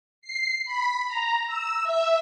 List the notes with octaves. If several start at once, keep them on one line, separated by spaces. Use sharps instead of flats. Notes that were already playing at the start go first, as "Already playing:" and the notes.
C7
B5
A#5
E6
E5